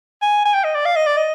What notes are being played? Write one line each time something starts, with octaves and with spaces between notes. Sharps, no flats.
G#5
G#5
G5
D#5
D5
F5
D#5
D5
D#5